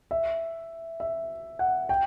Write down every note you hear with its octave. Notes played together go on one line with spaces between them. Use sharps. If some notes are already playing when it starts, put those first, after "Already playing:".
E5
E5
F#5
G5